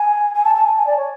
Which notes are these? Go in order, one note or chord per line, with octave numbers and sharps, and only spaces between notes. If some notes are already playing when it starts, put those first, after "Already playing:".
Already playing: G#5
G#5
A5
A5
G#5
G#5
D5
C#5